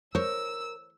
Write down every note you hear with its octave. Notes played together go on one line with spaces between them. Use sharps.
A#4 C5 C#5 E6